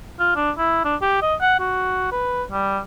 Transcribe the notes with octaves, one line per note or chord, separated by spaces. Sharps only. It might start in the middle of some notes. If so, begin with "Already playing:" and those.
F4
D4
E4
D4
G4
D#5
F#5
F#4
B4
G3